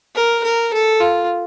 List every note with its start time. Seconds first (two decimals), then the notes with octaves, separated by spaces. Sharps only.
0.16 A#4
0.44 A#4
0.73 A4
1.01 F4